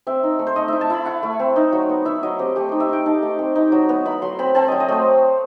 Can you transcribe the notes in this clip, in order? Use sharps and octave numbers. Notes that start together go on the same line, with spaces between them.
C4 E5
D#4
A3
C5
A3 D#5
E4 E5
A5
E4 B5
E4 F#5
A3
C4
D#4
F#3
B3
E4 E5
F#3 D#5
C4 G4
A3 G4
D#4 C5
E5
D#4 G5
D#4 A5
A3
C4
D#4
F#3
B3
E4 B5
F#3 C6
C4 B5
C4 A5
F#3 D#5
D#5
A3 C5